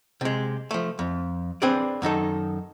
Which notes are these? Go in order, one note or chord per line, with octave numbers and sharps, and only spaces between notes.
C3 G#3
F3 A3
F2
C4 D4 G#4 B4 C5 D5
F#2 D#3 D#4 A4